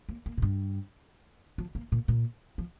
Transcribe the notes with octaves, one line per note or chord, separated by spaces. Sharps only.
A#3
A#3
A#2
G2
F3
A#3
A#2
A#2
F3